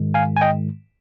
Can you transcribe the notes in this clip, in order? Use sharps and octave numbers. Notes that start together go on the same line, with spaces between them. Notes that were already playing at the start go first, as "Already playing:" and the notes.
Already playing: G#2 D#3 G#3
F5 G#5
G#5
D#5 G5